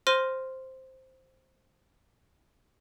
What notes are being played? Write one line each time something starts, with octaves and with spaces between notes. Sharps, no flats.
C5 C6 F6 A#6 D#7